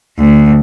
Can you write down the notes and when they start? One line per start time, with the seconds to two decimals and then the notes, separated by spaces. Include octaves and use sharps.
0.18 D2